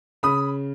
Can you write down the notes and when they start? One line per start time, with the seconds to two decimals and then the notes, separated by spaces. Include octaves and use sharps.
0.23 C#3 B5 D#6